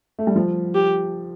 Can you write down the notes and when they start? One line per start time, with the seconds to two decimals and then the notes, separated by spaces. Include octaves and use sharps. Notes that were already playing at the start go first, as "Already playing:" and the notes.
0.19 A3
0.27 G3
0.36 F3
0.75 G4